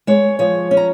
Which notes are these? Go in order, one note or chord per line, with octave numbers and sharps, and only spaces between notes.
G#3 C#5
F3 C#5
C#4
A#5